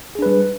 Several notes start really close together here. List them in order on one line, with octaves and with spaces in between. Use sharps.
G#4 D4 B4 G3